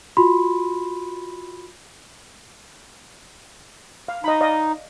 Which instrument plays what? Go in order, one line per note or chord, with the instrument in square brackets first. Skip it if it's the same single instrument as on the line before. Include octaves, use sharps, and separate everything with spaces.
[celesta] F4 F#4 B5 C6
[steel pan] F5
[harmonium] D#4 [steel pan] D#5 B5
[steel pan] D5 D#5 F5